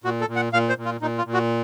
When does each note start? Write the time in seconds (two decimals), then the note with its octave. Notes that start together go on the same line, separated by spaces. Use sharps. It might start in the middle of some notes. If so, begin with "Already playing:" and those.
0.04 A#2 F#4
0.21 A4
0.28 A#2
0.36 F#5
0.53 A#2 F5
0.69 C5
0.77 A#2
0.85 F4
1.01 A#2 D#4
1.18 F4
1.25 A#2
1.34 F#4